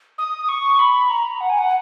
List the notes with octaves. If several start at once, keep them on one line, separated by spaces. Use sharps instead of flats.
D#6
C#6
B5
A#5
F#5
G#5
F#5